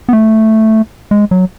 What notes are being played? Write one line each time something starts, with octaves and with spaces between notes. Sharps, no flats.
B3
A3
G#3
F#3